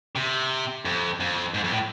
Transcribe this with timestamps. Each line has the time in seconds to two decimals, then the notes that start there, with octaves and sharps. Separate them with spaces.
0.16 C3
0.85 F2
1.20 F2
1.54 G#2
1.64 F2
1.71 A2